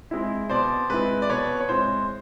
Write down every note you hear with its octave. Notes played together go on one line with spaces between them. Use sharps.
G#3 C4 E4
B2 C5 D5
G#3 C4 E4 B4
D5
B2 B4 C#5
C#5
G#3 C4 E4 C5